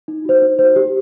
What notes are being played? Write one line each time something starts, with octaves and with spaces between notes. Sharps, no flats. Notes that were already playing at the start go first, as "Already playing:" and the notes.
D#4
F#4 C5
D#4
F#4 C5
G4